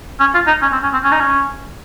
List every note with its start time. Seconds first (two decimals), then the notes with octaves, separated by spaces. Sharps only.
0.20 C#4
0.34 F4
0.47 D#4
0.62 C#4
0.72 C4
0.83 C#4
0.93 C4
1.04 C#4
1.12 D#4
1.20 C#4